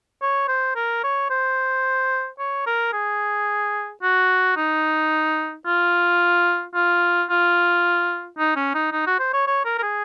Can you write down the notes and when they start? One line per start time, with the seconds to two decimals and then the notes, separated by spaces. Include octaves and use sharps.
0.22 C#5
0.48 C5
0.76 A#4
1.04 C#5
1.30 C5
2.39 C#5
2.67 A#4
2.93 G#4
4.03 F#4
4.57 D#4
5.66 F4
6.75 F4
7.30 F4
8.38 D#4
8.56 C#4
8.74 D#4
8.92 D#4
9.07 F#4
9.19 C5
9.33 C#5
9.47 C#5
9.65 A#4
9.78 A#4
9.83 G#4